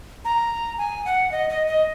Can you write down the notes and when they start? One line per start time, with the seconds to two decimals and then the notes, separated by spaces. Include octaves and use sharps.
0.25 A#5
0.78 G#5
1.05 F#5
1.32 D#5
1.49 D#5
1.67 D#5